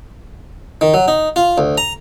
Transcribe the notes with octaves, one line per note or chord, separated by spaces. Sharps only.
D#3
F#3
D#4
F4
D2
A#5